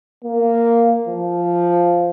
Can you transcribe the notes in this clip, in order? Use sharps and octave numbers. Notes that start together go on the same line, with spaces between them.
A#3
F3